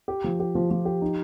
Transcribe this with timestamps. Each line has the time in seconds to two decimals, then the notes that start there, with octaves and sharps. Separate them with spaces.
0.08 G4
0.24 F3
0.40 G4
0.55 F3
0.71 F3
0.85 G4
1.02 D#4